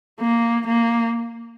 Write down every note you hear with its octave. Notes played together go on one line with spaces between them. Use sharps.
A#3
A#3